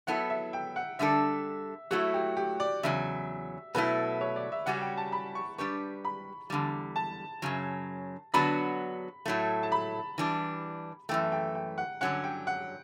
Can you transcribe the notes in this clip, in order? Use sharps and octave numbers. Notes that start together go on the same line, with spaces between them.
F#3 B3 E4 A4 F#5
E5
G5
F#5
D3 G3 D4 A4 E5
F#3 A3 E4 F#4
G4
G4
D5
E2 C#3 F#3 E5
B2 F#3 A3 E4 B4
C#5
D5
E5
C#3 G3 C#4 F#4 F#5
G5
A5
B5
C#6
G3 D4 G4 B4 C#6
B5
E2 D3 G3
A5
F#2 C#3 F#3
D3 F#3 B3 D4 F#4 B5
A2 F#3 A3
A5
B5
E3 G3 D4
F#2 E3 A3 G5
G5
G5
F#5
G2 D3 F#3 C#4 F#5
G5
F#5